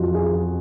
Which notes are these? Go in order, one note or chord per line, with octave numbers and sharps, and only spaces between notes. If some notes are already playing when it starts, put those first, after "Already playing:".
Already playing: F2 F4 F#4
G#4